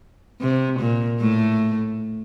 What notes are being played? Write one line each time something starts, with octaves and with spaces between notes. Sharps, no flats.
C3
A#2
A2 A3